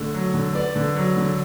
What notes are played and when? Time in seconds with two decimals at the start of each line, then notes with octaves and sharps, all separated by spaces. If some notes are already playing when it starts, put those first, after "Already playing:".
Already playing: D3 A3
0.14 F#3
0.34 D3
0.55 B3 D5
0.76 D3
0.96 F#3
1.17 D3